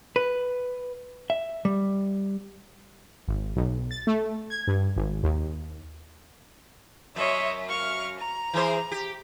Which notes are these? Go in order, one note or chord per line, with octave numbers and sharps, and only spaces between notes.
B4
E5
G3
G#1
B1
A6
A3
G#6
G2
G#1
D#2
F#2 C#5 D#5 E5
F5 C#6 F6
A#5
E3 G#4 C5
G4